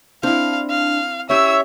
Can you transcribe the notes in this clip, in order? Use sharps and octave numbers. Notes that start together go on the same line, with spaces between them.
C4 D4 E4 F5
F5
C#4 E4 G4 C#5 E5 E6